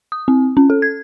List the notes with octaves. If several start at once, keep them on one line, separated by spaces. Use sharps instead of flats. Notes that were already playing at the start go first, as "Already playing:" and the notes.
D#6
C4
C#4
A4
G#6